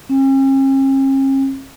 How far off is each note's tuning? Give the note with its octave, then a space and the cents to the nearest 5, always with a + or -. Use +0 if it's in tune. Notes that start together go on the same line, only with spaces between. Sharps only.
C#4 -45